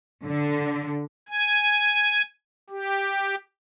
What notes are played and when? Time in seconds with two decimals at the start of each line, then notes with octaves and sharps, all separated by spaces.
0.25 D3
1.29 G#5
2.70 G4